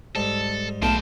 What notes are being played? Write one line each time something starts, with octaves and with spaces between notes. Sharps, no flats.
G#2 G3 A4
B1 G#3 A3 F5 G5 A5